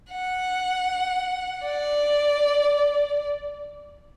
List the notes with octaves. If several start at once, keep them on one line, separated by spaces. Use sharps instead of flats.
F#5
D5